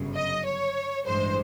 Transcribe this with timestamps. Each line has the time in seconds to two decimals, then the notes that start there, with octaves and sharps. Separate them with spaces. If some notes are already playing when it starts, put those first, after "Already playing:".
Already playing: G1 F#2 C#3
0.16 D#5
0.45 C#5
1.05 A1 G2 E3 G#3 C5